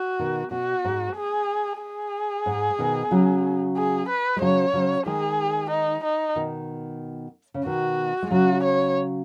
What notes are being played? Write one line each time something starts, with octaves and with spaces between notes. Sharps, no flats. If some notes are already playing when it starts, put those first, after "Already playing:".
Already playing: F#4
B2 D#3
B2 F#4
G#2
G#4
G#4
G#2
B2 D#3
C#3 F#3
G#4
B4
G#3
C#3 F#3 C#5
C#3 F#3
D#3 G#3 G#4
D#4
D#4
B2 D#3
C#3
B2 D#3 F#4
G#3
C#3 F#3 F#4
C#5